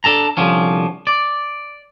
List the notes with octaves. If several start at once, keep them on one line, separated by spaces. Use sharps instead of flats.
D4 A4 A5 A#5
C2 D3 F3 C#4
D5